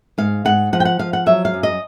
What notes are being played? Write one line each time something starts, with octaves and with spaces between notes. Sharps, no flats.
G#2 F5
G#2 F#5
F3 F#5
G5
F#5
F3 F5
F#5
F#3 E5
F5
F#2
D#5